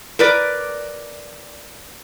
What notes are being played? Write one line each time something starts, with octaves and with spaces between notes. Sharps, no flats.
A#4 B4 D5